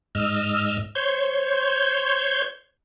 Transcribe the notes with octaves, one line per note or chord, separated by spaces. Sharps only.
G#2 D#5 E6 F6
C5 C#5 G6 G#6